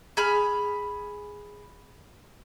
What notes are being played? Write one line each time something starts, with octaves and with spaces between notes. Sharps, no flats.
G#4 B5 F6